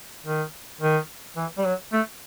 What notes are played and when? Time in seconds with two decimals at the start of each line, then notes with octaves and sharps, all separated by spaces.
0.26 D#3
0.81 D#3
1.37 E3
1.58 G3
1.65 F#3
1.93 A3